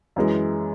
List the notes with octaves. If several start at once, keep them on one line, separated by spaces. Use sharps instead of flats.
F#2 E3 G#3